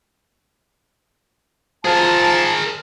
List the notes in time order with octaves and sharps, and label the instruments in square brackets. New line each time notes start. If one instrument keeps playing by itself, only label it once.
[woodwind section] F3 A5 [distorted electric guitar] G#4 A#4